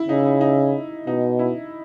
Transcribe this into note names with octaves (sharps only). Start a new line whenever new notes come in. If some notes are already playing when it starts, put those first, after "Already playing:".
Already playing: E4
C#3 D#4
D#4
D#4
B2 D#4
E4